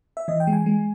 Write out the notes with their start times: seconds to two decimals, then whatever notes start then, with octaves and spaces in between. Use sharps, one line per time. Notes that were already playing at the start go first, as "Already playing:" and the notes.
0.17 E5
0.28 E3 D#5
0.40 G5
0.47 G#3
0.53 G#5
0.66 G#3